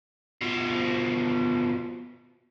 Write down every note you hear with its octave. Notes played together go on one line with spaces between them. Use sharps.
B2 F3